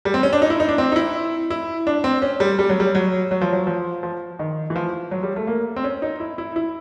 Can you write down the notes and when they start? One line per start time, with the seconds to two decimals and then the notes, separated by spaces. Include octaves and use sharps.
0.05 G3
0.14 C4
0.23 C#4
0.33 D4
0.42 D#4
0.50 E4
0.60 D#4
0.69 D4
0.78 C4
0.92 D#4
0.96 E4
1.50 E4
1.87 D4
2.04 C4
2.22 C#4
2.40 G3
2.59 G3
2.69 F#3
2.80 G3
2.95 F#3
3.31 F#3
3.41 F3
3.53 F#3
3.67 F3
4.03 F3
4.39 D#3
4.70 E3
4.76 F3
5.11 F#3
5.23 G3
5.36 A3
5.47 A#3
5.76 C4
5.84 C#4
6.02 D#4
6.20 E4
6.38 E4
6.56 E4